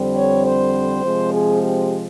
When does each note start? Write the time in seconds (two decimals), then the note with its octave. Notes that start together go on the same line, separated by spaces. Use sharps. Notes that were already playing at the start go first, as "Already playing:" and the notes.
Already playing: F2 D3 G3 C4
0.16 C#5
0.46 C5
1.04 C3 F3 G#3 C4
1.33 G#4
1.63 G4